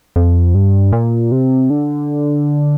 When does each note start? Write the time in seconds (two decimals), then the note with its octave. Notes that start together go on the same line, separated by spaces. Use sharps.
0.16 F2
0.55 G2
0.92 A#2
1.32 C3
1.70 D3